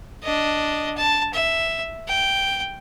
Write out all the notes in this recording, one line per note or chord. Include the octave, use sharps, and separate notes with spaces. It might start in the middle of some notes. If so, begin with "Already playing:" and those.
D4 D#5
A5
E5
G5